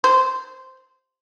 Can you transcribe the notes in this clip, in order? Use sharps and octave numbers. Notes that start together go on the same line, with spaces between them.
C5